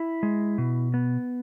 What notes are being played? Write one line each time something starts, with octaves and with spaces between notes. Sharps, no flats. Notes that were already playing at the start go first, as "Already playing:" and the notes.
Already playing: E4
G#3
B2
B3